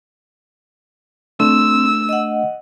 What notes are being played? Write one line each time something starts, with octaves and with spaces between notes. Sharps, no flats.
A3 C4 D4 E6
D#5 F#5